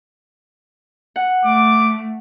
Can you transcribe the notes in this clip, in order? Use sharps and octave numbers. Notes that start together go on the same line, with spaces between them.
F#5
A3 D6